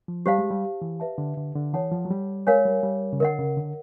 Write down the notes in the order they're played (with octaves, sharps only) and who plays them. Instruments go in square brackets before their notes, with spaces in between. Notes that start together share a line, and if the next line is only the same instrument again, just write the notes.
[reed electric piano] F3
[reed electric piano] G3 [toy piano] G4 C5 F5 A5
[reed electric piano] G#3
G3
E3
[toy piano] B4 E5 A5
[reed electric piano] D3
D3
D3
[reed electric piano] E3 [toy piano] A4 C#5 F#5 A5
[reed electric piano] F3
F#3
G3
[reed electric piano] G#3 [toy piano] A#4 C#5 F5 G#5
[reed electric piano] G3
G3
C#3
[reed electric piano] D3 [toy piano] A#4 D#5 F#5
[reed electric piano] C#3
D3